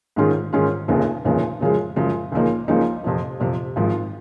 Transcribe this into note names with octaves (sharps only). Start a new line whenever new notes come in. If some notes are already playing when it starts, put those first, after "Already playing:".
G#2 D#3 G#3 C#4 F4
G#2 D#3 G#3 C#4 F4
F1 D#2 C#3 F3
F1 D#2 C#3 F3
F#2 C#3 F3 G#3
F#2 C#3 F3 G#3
C#2 C#3 F3 A#3 D#4
C#2 C#3 F3 A#3 D#4
F2 C3 F3
F2 C3 F3
G#1 G#2 F3